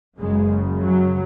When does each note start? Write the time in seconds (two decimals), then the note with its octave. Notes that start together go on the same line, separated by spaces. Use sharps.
0.18 F#1 F#2 C#3 G#3
0.82 F#3